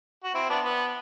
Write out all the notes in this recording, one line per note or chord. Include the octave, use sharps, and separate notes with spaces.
F#4
C4 E4
B3 D4
B3